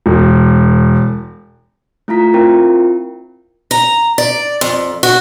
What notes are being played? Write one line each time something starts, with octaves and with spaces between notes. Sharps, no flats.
E1
A3 E4 F4 A#5 B6
C4 E4 F4 A#4 G5
A#5
D5
F2
F#4